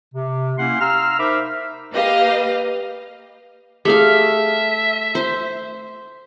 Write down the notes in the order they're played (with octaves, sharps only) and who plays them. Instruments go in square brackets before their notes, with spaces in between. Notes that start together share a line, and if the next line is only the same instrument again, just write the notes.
[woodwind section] C3
A#3 C#4 E4 G4 F#5 C6
F5 A#5 C6 E6 F6
D#4 A#4 C5 E5 B5 D6
[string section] A#3 G4 B4 D#5 F5
[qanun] A3 F5 [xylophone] G4 G#4 [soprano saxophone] E5
[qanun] C5